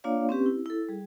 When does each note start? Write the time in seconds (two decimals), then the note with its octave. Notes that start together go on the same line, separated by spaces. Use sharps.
0.04 A#3 D4 F4 C#5 D5 F5
0.29 C4 C#4 G4 B4
0.46 E4
0.66 E4 A4
0.89 G3 G#4